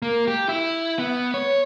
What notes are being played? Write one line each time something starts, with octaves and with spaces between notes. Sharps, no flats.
A#3
G4
E4
B3
C#5